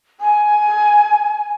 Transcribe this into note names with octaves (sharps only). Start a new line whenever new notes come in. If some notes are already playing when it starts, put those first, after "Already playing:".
G#5